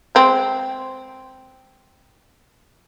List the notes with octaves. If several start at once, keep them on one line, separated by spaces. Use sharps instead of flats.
G#3 C4